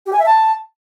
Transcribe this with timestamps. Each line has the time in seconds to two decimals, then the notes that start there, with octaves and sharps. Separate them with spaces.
0.06 G4
0.13 G#5
0.19 E5
0.26 A5